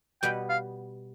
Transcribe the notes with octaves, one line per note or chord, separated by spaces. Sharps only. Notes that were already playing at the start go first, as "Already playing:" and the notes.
B2 G3 B3 G5
F5